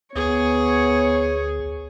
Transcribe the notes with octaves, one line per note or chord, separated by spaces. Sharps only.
D2 B3 G#4 C#5